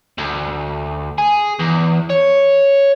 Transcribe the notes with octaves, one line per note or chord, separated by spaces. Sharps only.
D2
G#4
E2
C#5